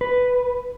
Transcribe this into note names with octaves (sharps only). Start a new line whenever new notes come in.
B4